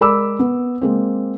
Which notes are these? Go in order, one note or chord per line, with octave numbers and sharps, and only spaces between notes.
G#3 A#4 D5 B5 D6 E6
B3
G#3 A#3 C4